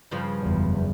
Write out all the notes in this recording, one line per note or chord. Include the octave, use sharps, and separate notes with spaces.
G2 C#3 F3
F#1 E2